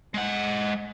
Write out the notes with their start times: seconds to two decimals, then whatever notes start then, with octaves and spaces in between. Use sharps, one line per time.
0.14 G#3 F#5